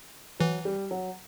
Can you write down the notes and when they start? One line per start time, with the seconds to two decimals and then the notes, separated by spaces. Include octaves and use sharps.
0.40 E3 F#3
0.65 G3
0.91 F#3